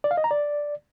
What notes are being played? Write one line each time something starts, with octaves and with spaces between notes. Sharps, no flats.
D5
F5
D#5
A#5
D5